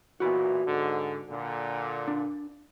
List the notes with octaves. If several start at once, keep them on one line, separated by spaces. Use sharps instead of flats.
B1 A#2 E3 F#4 B5
G#2 D3
A#2 D3
D4